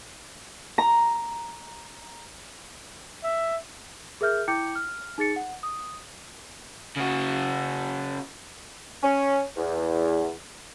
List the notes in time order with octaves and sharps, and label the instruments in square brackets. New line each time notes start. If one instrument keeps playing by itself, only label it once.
[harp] A#5
[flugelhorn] E5
[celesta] G#4 A#4 E5 F6 G6
E4 G5 D6 G6 C#7
F6
D#4 G#4 A6 C#7
F#5
D#6
[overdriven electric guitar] C#3 F#4
[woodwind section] C#4
E2